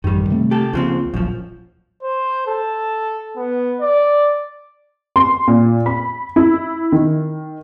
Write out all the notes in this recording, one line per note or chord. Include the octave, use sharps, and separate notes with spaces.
A1 F#2 D#3 G3
C3 A3 C4
G4 A4
C#2 C#3 F3 A#3 C4
D1 A#1 F#2 F3
C5
A4
B3
D5
C6
A#2
B5
E4
D#3